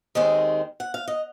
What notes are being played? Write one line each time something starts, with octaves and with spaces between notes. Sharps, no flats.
D#2 D#3 G#3 C4 D#5
F#5
F5
D#5